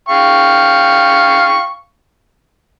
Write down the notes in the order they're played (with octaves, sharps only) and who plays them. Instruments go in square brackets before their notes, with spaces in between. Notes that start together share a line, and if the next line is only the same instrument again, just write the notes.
[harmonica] F5 G5 C#6